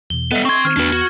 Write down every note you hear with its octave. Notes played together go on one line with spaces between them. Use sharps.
E2 B2 G7
G3 B3 A4 D#5 E5
C4 C6 C#6 G#6
D#3 C4 F6
E2 B3 D4 F#4 B4
F#4